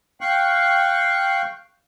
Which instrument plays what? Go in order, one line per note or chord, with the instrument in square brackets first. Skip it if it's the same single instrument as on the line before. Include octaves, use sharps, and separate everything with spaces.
[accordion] F5 G5 C#6 F#6